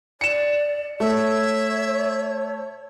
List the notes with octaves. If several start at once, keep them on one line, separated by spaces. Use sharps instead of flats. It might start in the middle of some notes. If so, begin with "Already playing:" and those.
D5 C#7 E7
A3 C#5 E5